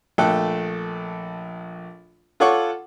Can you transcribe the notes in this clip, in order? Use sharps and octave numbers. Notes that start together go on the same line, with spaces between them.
A#1 A3 A4 G5 F#6
F4 A4 C#5 F#5 C#6 D6